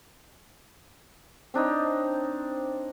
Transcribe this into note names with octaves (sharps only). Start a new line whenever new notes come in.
C4 D4 D#4 C#5